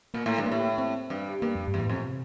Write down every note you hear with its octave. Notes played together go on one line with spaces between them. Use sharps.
A#2 A#3
A2
G2
A#3
A2
C4
G2
G2 A#3
F2
G2
E2
A2
F2 A#2
C3